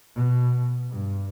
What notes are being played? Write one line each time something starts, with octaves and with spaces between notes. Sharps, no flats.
B2
G2